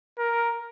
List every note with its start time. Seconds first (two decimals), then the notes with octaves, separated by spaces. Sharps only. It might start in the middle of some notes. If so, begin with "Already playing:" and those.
0.19 A#4